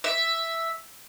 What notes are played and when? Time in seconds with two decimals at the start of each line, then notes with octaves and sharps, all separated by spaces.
0.04 E5